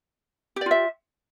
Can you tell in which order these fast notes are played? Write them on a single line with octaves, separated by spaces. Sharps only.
G4 D5 F4 E5